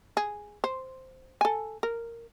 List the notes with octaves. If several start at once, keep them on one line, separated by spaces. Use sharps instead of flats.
G#4
C5
A4 G#5
A#4